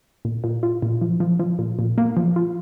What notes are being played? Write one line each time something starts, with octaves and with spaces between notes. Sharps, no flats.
A#2
A#2
F4
A#2
F3
F3
F3
A#2
A#2
A#3
F3
F4